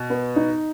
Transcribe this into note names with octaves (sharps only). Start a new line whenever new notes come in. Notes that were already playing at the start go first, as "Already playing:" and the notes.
Already playing: B2
B3
D#4